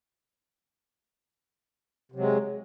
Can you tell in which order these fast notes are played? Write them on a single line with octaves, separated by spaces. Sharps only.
C3 F#3 G#3